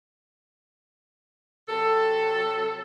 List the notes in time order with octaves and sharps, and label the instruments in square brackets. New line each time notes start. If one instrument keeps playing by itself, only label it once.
[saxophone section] C3 F#3 A4